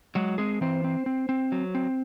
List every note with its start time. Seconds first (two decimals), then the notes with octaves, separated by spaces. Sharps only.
0.15 F#3 G#3 F#4
0.38 G#3 C4 G#4
0.61 E3 C4 C5
0.84 C4
1.06 C4
1.29 C4
1.52 F#3
1.75 C4